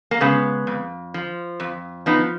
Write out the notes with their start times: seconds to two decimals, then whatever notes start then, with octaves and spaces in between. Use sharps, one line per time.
0.11 A#3
0.21 C#3 G#3 B3
0.67 F2
1.14 F3
1.60 F2
2.06 F3 B3 D#4